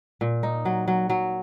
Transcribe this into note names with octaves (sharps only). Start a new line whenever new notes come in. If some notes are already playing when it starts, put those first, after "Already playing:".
A#2
D#4
F#3
F#3
F#3